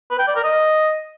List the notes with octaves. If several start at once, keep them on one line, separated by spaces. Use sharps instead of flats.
B4
G5
D5
A#4
D#5